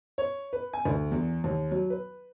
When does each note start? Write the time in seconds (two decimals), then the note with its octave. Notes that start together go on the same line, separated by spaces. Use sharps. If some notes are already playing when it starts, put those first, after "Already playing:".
0.18 C#5
0.53 B4
0.73 G#5
0.85 D2
1.12 E2
1.44 D#2
1.71 F#3
1.90 B4